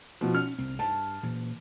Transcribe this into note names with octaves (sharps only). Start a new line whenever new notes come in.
B2 F3
C#4 F6
C2 C4
G2 A5
A#2 E3